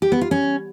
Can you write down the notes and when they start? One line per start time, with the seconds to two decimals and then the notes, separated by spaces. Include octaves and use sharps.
0.02 G4
0.12 B3
0.21 F4
0.31 C#4